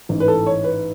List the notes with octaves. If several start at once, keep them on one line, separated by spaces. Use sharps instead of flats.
A1 G#2 E3
B4
A4
C#5
B4